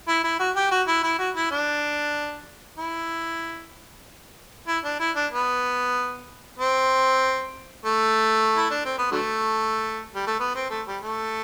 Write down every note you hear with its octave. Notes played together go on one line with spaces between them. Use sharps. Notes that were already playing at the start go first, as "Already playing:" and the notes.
E4
E4
F#4
G4
F#4
E4
E4
F#4
E4
D4
E4
E4
D4
E4
D4
B3
C4
A3
E4
D4
C4
B3
D3 F#3 A3
G3
A3
B3
C4
A3
G3
A3